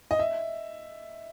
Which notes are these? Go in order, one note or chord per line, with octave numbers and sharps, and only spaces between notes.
D#5
E5